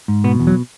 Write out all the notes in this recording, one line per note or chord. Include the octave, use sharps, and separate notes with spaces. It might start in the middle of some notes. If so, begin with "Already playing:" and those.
G#2
B2 B3
E2
F#3